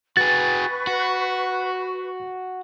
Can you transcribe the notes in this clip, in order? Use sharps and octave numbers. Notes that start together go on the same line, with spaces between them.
F#4 G#4 B4 C#6 A6
F#4